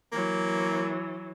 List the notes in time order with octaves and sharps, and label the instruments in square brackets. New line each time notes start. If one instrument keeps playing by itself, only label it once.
[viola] E3 F#3 [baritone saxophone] A#3